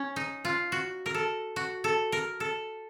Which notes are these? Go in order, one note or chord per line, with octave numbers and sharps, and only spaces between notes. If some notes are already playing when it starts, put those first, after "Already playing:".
Already playing: C#4
D#4
F4
F#4
A#4
A4
F#4
A4
A#4
A4